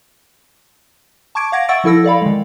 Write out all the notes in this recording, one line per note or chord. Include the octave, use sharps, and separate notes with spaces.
A5 C#6 D6 G#6 D7
F5 F#5 G#6 A#6
E5 F#5 C#6 E6 A6 D7
F3 E4 A4 E6 A#6
A4 D5 F5 B5
D#3 G#3